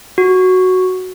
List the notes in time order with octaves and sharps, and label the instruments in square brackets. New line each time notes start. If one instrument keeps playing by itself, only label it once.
[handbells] F#4